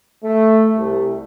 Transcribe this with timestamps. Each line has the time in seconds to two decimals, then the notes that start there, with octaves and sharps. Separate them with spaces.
0.24 A3
0.76 C2